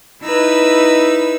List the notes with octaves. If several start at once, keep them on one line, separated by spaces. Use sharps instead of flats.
D#4 E4 B4 E6